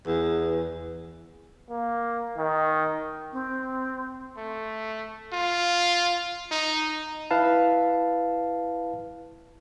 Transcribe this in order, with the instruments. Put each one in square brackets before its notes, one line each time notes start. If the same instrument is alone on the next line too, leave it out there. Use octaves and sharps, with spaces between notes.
[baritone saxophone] E2
[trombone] A#3
D#3
[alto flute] C4
[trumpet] A3
F4
D#4
[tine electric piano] E4 B4 F5 A5